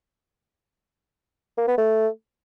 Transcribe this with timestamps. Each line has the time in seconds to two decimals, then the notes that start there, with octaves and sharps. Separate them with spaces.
1.58 A#3
1.68 B3
1.78 A3